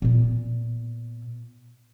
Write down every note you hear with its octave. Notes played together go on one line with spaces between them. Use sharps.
A#2 B3